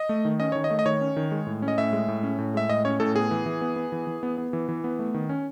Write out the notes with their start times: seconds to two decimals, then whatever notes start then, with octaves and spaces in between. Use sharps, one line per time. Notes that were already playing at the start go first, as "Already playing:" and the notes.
Already playing: D#5
0.09 A3
0.25 D#3
0.40 C#4 D#5
0.52 D#3 C#5
0.64 D#5
0.71 A3
0.79 D#5
0.86 D#3 C#5
1.01 C#4
1.17 D#3
1.31 G#3
1.47 A2
1.62 C#4
1.68 D#5
1.78 A2 E5
1.93 G#3
2.08 A2
2.23 C#4
2.38 A2
2.54 G#3 E5
2.69 A2 D#5
2.85 C#4 C#5
3.00 A2 A4
3.16 B3 G#4
3.31 E3
3.46 E3
3.61 B3
3.76 B3
3.92 E3
4.07 E3
4.23 B3
4.38 B3
4.53 E3
4.69 E3
4.84 B3
4.99 A3
5.14 D#3
5.29 C#4